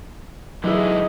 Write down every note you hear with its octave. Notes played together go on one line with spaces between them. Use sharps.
D3 E3 F#3 G#3 D#4 E4 G#4 D#5